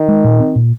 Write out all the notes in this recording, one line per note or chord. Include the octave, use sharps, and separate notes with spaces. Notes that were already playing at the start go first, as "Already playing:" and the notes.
Already playing: D#3
G#3
A#2
C4
A#2